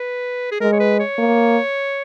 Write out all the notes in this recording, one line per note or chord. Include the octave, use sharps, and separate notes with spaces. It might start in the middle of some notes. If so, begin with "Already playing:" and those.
Already playing: B4
G#4
G#3 A#4
C#5
B4
C#5
A#3